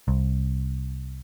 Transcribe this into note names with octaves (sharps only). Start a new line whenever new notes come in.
C2